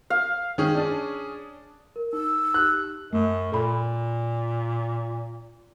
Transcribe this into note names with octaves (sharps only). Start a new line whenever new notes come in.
F5
D#3 C#4 G#4
D4 D5
A#4
D#4 E6
D#4 G4 F#6
F#2 A3
A#2 A4 B5